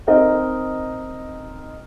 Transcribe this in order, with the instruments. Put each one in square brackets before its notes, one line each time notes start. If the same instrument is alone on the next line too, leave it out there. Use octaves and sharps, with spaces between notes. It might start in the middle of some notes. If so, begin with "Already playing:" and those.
[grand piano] C4 D#4 A#4 D#5